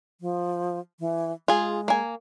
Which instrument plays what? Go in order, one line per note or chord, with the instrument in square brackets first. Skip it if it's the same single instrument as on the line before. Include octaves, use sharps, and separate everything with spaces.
[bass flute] F3
E3
[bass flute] G#3 [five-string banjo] F4 G#4
[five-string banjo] A#3 G#5